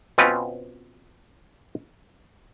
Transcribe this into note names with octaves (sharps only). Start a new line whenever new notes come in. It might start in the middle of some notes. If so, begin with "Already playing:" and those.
B2 C4 C#4 F4 B4